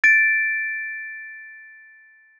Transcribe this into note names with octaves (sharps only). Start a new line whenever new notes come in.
A6 D7